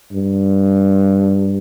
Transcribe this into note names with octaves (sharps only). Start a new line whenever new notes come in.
G2